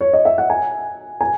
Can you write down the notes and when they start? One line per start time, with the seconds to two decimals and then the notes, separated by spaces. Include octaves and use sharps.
0.01 C#5
0.13 D#5
0.25 E5
0.38 F#5
0.50 G#5
1.21 G#5